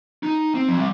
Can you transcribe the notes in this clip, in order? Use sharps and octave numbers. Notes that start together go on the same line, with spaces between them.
D#4
C4
F3
G3